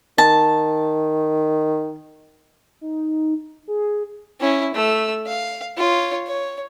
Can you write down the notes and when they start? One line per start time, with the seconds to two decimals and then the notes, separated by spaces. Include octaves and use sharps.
0.18 D#3 A5
2.81 D#4
3.68 G#4
4.40 C#4 E4
4.74 A3 E6
5.26 F5
5.77 F4 C#5
6.26 C#5